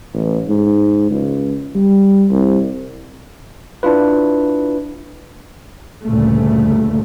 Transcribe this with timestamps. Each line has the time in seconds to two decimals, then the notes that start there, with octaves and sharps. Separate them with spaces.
0.14 A1
0.48 G#2
1.10 C#2
1.75 G3
2.30 C2
3.83 D4 E4 F4 B4
6.04 D2 G2 A#2 C#3 A3